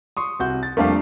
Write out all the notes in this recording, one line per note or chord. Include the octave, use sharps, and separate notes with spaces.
C6 C#6 D#6
C2 F#4 G6
A6
F2 G3 A3 A#3 D4 F5